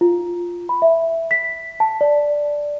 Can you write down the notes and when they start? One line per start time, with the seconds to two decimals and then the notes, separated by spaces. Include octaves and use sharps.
0.01 F4
0.69 B5
0.82 E5
1.31 B6
1.80 A5
2.01 D5